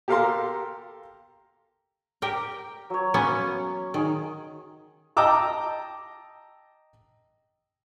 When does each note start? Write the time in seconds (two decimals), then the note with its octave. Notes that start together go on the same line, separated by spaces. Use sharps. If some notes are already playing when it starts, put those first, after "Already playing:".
0.08 G4 A4 A#4 F5 A#5 C6
2.22 G4 A#4 G5
2.90 F#3 C#5
3.14 A#3 B3 C#4
3.94 D#3 G#4
5.17 D#5 G5 A5 A#5 D6 E6